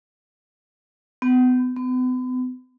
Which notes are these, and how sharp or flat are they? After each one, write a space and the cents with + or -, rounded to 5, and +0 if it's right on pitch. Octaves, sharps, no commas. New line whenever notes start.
B3 +35
B3 +40